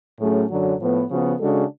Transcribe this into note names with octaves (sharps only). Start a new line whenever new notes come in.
A2 F#3 A3 C#4 G#4
F#2 D3 F#3
A2 F3 B3
C#3 F3 B3 F#4
C#3 G#3 D4 F#4 A4